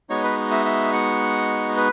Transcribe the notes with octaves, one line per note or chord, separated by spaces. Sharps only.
G#3 B3 D#4 F#4 C#5
B4
E5
E5
F#5
B4